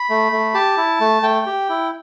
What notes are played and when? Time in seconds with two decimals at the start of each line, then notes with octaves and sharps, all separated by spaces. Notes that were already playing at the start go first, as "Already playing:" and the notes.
Already playing: B5
0.10 A3
0.32 A3
0.54 G4 A5
0.77 E4
1.00 A3
1.22 A3 G5
1.46 G4
1.69 E4